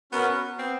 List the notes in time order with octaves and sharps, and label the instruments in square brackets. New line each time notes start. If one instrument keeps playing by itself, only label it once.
[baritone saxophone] B3 [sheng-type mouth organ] C#4 F#4 A#4
[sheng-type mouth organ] B3 [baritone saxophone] C4